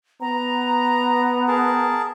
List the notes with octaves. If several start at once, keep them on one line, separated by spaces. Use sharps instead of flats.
B3 A#5
G#4 A#4 A5